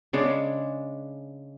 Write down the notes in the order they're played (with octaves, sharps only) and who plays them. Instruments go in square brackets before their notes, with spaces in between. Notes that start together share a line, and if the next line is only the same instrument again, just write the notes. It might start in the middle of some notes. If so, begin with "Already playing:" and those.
[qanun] C#3 G#3 D4